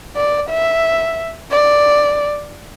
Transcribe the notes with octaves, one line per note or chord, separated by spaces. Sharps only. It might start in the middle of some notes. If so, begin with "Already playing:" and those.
D5
E5
D5